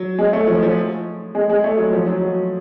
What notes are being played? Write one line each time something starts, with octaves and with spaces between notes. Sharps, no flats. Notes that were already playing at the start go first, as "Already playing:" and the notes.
Already playing: F#3
G#3
A3
F3
F3
G#3
G#3
A3
F#3
F3
F#3
F#3